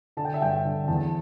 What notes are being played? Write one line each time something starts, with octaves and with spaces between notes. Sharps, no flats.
D3 A5
G5
E5
G2 G5
D3
E2 A5